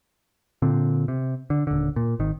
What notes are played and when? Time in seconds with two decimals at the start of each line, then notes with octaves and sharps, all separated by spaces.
0.62 A#2 D3 C4
1.08 C3
1.50 D3
1.67 D#1 D3
1.96 A#2
2.19 G#1 D#3